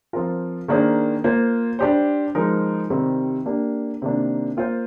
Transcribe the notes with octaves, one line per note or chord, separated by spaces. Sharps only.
F3 C4 F4 A#4
D#3 A#3 D4 G#4 C5
A#3 F4 C5
G3 D4 G4 C5
F3 G#3 D#4 A#4
C3 D#3 G3 C4
A#3 D4 G4
C3 D#3 A#3 D4
A#3 F4 C5